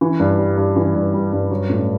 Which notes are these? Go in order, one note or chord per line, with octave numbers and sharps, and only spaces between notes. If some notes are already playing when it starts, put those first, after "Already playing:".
E3
G2
G3
G2
E3
G2
G3
G2
F#3
A2